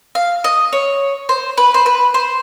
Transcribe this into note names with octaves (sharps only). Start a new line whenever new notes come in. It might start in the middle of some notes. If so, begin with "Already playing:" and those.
F5
D#5
C#5
C5
B4
C5
B4
C5